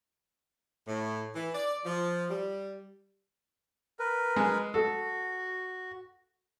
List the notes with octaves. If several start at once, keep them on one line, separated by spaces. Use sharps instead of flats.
A2
E3
D5
F3
G3
A#4 B4
G#3
F#4 A4